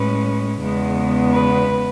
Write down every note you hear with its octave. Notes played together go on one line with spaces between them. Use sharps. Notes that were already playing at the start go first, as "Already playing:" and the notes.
Already playing: A2 G#3 C#4 B4
E2 C#3 G#3 B3
B4